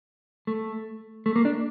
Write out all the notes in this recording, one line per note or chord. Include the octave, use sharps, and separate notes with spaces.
A3
A3
A#3
D4